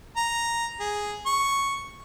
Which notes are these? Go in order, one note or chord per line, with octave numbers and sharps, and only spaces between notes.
A#5
G#4
C#6